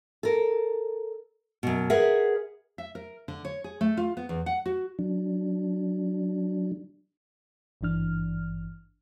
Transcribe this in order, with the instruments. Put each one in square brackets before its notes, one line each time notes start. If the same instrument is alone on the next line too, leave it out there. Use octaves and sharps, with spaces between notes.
[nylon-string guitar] A4 A#4
F#2 B2
G#4 A#4 B4 E5 F#5
E5
A#4
D3
C#5
G#4
A3
F4
B3
E2
F#5
F#4
[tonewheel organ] F#3 D4
[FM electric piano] G#1 G2 E3 D4 F6